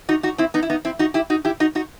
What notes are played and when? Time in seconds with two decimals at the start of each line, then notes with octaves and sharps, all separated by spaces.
0.09 D#4 F#4
0.23 D#4 F#4
0.38 C4 E4
0.54 B3 D#4
0.63 E4
0.70 B3 D#4
0.85 C4 E4
0.99 D#4 F#4
1.14 E4 G4
1.30 D#4 F#4
1.45 E4 G4
1.60 D#4 F#4
1.75 D#4 F#4